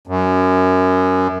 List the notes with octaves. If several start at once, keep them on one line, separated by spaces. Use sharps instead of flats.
F#2